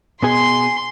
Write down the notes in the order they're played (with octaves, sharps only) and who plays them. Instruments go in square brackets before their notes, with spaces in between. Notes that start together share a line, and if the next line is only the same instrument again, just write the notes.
[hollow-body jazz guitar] B2 B3 G#4 [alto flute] G#5 [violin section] C6